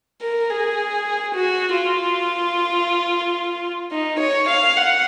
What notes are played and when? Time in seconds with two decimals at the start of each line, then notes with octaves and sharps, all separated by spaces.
0.21 A#4
0.49 G#4
1.35 F#4
1.77 F4
3.91 D#4
4.19 C#5
4.49 F5
4.76 F#5